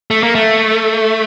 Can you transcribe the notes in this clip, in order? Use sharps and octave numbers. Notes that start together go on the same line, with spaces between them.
A3
A#3
A3